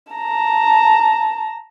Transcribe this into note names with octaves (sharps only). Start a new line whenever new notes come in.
A5 A#5